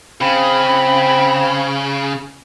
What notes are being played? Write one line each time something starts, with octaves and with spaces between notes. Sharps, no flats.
C#3 C4 B5